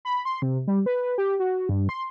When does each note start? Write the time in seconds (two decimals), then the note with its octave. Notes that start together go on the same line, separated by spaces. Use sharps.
0.05 B5
0.25 C6
0.42 C3
0.67 G3
0.86 B4
1.18 G4
1.40 F#4
1.69 G2
1.89 C6